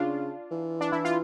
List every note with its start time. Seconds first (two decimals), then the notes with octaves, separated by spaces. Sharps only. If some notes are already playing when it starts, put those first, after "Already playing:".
Already playing: C#3 D4 F4
0.51 E3
0.81 D4
0.92 E4
1.05 F4